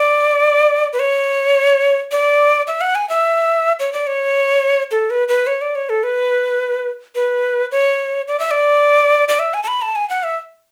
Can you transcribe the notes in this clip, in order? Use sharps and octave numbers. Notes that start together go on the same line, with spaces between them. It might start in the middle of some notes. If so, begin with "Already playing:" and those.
Already playing: D5
B4
C#5
D5
E5
F#5
G#5
E5
C#5
D5
C#5
A4
B4
B4
C#5
D5
C#5
A4
B4
B4
C#5
D5
E5
D5
D5
E5
G#5
A5
B5
A5
G#5
F#5
E5